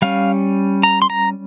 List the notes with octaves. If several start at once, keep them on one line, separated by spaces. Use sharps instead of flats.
G3 C#4 F5
A#5
C6
A#5